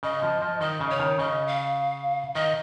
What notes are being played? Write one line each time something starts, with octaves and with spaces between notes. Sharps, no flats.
C#3 D#5
F3
F3
D#3 D#5
C#3
C#5
D#3
C#3 D#5
F5
D#3 D#5